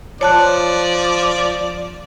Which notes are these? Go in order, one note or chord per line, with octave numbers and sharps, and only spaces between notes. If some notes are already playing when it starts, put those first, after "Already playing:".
F3 C#5 D5 A5 F#6